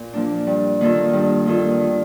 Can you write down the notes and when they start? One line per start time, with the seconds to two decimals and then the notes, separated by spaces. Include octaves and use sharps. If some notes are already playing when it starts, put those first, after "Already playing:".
Already playing: A#2
0.13 F3 A#3 D4
0.47 G2
0.81 D#3 A#3 F4 A4
1.13 G2
1.46 D#3 A#3 F4 A4
1.81 D#3